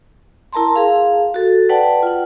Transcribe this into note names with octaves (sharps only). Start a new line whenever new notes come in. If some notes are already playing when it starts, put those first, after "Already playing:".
E4 A#4 A5 A#5 C6
G#4 F5
F#4 A4
B4 D5 F#5 G5 A5
F4 F#5